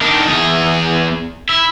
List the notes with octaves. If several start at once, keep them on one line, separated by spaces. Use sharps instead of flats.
D#3 D4
E2 G#4
E4